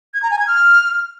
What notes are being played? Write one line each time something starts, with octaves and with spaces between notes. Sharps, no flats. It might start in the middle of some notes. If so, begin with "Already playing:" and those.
G#6
A#5
G#5
G#6
F6